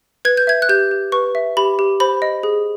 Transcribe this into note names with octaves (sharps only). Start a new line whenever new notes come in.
B4 G#6
G6
E5 G#6
F#6
G4 G6
G4
B4 C#6
E5
G4 B5
G4
C5 B5
D#5
G#4